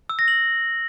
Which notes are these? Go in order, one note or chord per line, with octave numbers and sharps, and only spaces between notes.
E6
A#6
F#7